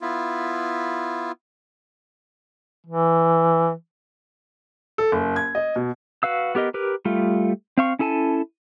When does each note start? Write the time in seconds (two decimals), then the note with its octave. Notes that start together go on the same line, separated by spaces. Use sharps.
0.01 B3 E4 F4
2.87 E3
4.98 A4
5.12 F#1
5.36 G#6
5.55 D#5
5.76 B2
6.23 F#4 B4 F5 E6
6.55 B3 G4 A#4 D#5
6.74 G4 A#4 B4
7.05 G3 A3 F4
7.77 C4 F5 C#6
7.99 C#4 E4 A4 G#5 A5